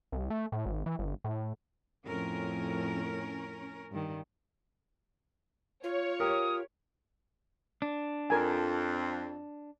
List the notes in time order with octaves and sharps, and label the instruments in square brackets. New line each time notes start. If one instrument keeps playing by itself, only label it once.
[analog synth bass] C2
A3
A2
G#1
E3
G1
A2
[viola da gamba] F2 A2 [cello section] C#4 A#4
[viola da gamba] G2 D#3
[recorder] F4 [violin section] C#5
[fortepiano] G4 A#4 [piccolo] D#6
[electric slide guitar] D4
[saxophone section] F2 [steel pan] A#4 G#5